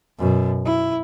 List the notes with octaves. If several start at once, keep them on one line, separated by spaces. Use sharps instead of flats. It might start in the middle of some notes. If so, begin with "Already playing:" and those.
F#2 B2
E4